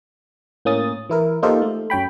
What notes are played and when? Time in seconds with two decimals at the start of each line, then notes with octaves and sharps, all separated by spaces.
0.65 A2 A#3 C#4 D#6 A6
1.10 E3 E4 A#4
1.42 A#3 D#4 F4 G4 A4 C5
1.62 A3
1.90 F#2 C#5 G5 B5